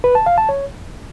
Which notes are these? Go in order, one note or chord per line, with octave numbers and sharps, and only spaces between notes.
B4
A5
F5
A5
C#5